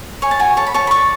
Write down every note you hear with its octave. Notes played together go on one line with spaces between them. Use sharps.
C#5 G#5
A5
F#4 G#5
C#5 A5
B5
C#5 A5
B5
D5 C#6